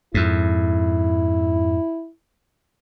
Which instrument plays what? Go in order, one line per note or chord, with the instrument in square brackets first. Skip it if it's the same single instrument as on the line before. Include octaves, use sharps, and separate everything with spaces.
[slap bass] F2 G#2 [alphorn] E4